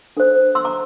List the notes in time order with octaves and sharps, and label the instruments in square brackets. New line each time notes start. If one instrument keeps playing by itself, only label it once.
[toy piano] D4 A4 C5
C6 E6
A#5 D6